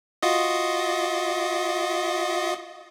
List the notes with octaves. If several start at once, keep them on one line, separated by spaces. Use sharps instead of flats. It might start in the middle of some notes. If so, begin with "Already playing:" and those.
F4 F#4 D#5